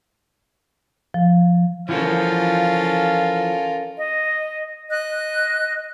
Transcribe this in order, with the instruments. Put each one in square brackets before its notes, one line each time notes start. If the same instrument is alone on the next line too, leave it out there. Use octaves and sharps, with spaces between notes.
[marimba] F3
[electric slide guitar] E3 F3 F#4 [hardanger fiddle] C#4 A4 [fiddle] F4 A#4 [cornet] F5
[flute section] D#5
D#5 F#6